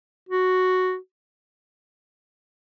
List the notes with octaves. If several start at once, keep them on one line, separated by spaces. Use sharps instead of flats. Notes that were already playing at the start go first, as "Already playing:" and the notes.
F#4